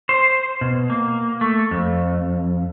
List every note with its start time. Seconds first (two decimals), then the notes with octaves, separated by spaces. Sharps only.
0.09 C5
0.61 B2
0.90 A#3
1.41 A3
1.71 F2